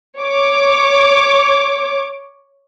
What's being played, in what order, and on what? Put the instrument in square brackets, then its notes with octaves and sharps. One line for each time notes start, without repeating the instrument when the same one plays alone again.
[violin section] C#5 D6